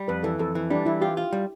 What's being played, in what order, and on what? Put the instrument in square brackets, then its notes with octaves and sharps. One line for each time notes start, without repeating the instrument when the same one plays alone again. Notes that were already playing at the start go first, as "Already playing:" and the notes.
Already playing: [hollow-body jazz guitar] G3
[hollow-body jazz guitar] F2 [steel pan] B4
[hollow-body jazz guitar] E3 [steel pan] A4
[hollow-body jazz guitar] F2 [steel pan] A4
[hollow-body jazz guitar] E3
[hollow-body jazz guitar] G3 [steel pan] D4
[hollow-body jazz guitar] E3 [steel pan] E4
[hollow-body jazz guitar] F4 [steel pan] G4
[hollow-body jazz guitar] F4
G3